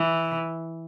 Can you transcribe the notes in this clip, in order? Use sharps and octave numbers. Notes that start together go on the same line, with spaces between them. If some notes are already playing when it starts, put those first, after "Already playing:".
Already playing: E3